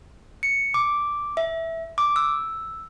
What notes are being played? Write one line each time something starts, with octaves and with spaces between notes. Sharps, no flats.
C#7
D6
E5
D6
E6